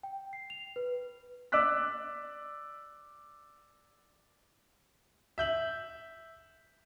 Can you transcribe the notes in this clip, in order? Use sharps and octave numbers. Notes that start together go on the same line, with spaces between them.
G5
C7
F7
B4
D5 D6 E6 F#6 B6
E5 G6 F#7